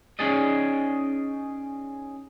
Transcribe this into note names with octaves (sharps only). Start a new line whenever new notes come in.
C#4 D#4 G#4 D5 D#5